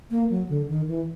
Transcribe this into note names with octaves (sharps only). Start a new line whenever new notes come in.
A#3
F#3
D3
D#3
E3